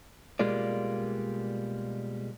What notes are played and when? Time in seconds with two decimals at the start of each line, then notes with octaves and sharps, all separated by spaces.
0.39 B2 G3 G#3 A#3 F4 D5